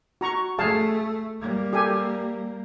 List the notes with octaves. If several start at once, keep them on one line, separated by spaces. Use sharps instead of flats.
F#4 A#5 C#6
A3 G#4 F5 A5
G3 A#3
G4 A4 G#5